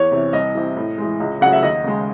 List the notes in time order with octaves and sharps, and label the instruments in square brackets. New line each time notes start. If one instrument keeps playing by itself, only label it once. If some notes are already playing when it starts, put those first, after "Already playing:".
Already playing: [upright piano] E2 C#5
C3 E3
C2 D#5
C3 E3
A2
E3 G#3
C#2
C#3 F#3 A3 F#5
E5
D#2 D#5
C#3 G#3